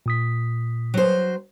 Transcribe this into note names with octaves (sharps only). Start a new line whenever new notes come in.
A#2 D#6 B6
F#3 C5